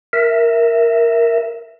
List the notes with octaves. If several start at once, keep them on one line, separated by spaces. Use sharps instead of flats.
A#4 E5